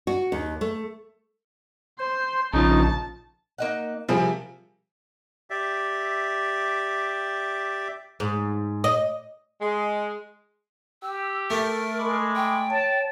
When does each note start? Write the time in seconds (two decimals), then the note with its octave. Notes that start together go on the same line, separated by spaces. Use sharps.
0.07 F#4
0.32 D#2
0.61 A3
1.99 C5 C6
2.53 A#1 C#3 F3 D#4 A5
3.58 A#3 D#4 F#5
4.09 C3 F3 G3 A#3 G#4
5.50 G4 D5 E5
8.20 G#2
8.84 D#5
9.62 G#3
11.02 G4 E6
11.50 A3 A#4
11.98 G#3 B5 C#6 D6
12.36 G5
12.70 C#5 A5